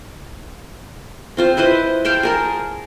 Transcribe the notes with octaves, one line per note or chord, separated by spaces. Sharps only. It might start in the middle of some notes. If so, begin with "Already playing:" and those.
C4 F4 C5
E4 B4 C5 D#5
F5 G5 A5 C6
G#4 A#4 A5